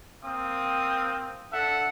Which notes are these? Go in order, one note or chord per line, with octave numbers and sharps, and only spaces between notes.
A#3 C4 F5 D#6
D4 A4 E5 F#5